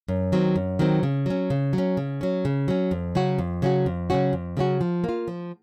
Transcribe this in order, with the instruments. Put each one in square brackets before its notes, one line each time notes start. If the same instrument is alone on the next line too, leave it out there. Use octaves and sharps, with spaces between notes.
[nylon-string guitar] F#2
D#3 F#3 C4
F#2
D#3 F#3 C4
C#3
F#3 C#4
C#3
F#3 C#4
C#3
F#3 C#4
C#3
F#3 C#4
F2
C#3 F#3 C#4 F#4
F2
C#3 F#3 C#4 F#4
F2
C#3 F#3 C#4 F#4
F2
C#3 F#3 C#4 F#4
F3
A#3 F4
F3